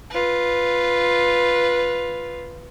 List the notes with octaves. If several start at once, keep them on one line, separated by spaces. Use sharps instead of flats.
F4 B4